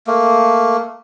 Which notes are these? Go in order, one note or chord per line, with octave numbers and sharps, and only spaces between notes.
A3 A#3